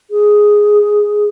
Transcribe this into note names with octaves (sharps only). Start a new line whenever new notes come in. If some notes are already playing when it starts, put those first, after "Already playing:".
G#4